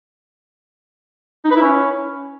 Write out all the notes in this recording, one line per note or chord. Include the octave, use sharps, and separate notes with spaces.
D#4
B4
E4
C#4